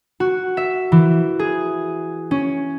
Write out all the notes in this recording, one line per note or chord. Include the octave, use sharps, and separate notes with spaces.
F#4
E5
E3
G#4
C#4